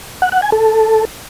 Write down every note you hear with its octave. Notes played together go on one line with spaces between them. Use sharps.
F#5
F#5
G#5
A4